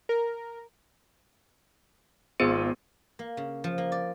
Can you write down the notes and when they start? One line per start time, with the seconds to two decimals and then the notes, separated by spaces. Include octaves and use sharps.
0.09 A#4
2.40 G#1 B3 F4 G#4 C5 D#7
3.19 A#3
3.37 C#3
3.64 F3
3.78 A#3
3.92 D5